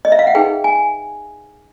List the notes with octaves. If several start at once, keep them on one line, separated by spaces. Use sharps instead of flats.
D#5
E5
F5
F#5
D#4 G#4 B4 G5
G#5